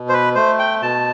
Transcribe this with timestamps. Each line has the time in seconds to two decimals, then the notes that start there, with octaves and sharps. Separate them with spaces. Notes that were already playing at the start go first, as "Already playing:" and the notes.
Already playing: B2
0.09 C5
0.13 B4
0.35 A3 C5
0.59 G5
0.82 B2 A5